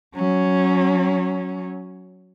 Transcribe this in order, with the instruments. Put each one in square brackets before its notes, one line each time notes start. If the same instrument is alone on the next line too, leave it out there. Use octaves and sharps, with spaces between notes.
[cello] F#3 C#4